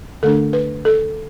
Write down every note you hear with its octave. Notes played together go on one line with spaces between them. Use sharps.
D3 A3 D4 A4
B4
A4